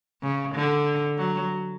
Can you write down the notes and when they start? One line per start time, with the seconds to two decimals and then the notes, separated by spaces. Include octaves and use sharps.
0.23 C#3
0.55 D3
1.18 F#3